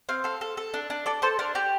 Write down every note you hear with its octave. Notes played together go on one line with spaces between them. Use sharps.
C4 F5
A4 F5
A4
A4
D4
D4
A4 D5
A4 C5
D4 A#4
G4 D5